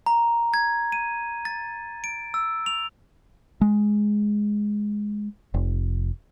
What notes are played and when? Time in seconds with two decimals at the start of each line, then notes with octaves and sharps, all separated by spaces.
0.06 A#5
0.54 G#6
0.92 D#7
1.45 A6
2.04 D7
2.34 E6
2.66 F7
3.61 G#3
5.54 F1